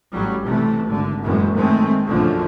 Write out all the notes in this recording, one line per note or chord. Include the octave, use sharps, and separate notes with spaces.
A1 F#3 G3
C3 E3 A3
G#1 D3
F#1 F#2 A2 E3 G#3
D#3 G#3 A3 C4
B1 F#2 D3 F3 A3